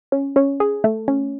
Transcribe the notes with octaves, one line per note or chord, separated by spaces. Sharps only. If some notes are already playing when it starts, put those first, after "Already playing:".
C#4
C#4
G#4
A3
C#4